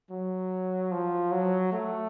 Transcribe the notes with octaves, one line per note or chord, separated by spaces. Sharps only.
F#3
F3
F#3
A3